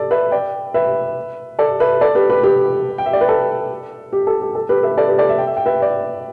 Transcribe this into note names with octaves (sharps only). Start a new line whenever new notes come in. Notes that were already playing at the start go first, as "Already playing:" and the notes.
Already playing: A4 D5
B4 E5
D5 G5
B4 E5
A4 D5
B4 E5
A4 D5
G4 B4
G4 B4
G4 B4
G5
E5
D5
B4
A4
G4
A4
G4
A4
G4 B4
B4 E5
A4 D5
G4 B4
A4 D5
E5
G5
E5
G5
B4 E5
D5 G5